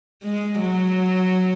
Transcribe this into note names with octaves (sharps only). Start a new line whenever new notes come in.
G#3
F#3